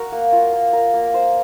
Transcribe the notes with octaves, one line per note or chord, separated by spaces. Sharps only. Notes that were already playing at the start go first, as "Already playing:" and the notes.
Already playing: F#4 A#4
A#3
F4
A#3
A#4
A#3
C5